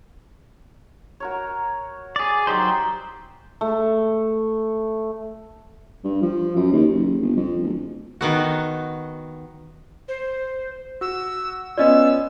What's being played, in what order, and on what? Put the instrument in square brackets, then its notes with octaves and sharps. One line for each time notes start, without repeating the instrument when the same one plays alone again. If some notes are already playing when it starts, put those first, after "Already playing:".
[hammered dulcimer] F#4 A#4 C#5
[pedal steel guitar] G#4 D5
[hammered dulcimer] D#3 D#4 [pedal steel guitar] F#3 G4 C5
[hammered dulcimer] A3
[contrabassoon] G2
F3
F#2
D#2
F#1
G1
F2
D1
[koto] D#3 B3 F#4
[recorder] C5
[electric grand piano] F#4 [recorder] E6
[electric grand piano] B3 C#4 F4 [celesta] D5 D#5 [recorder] E6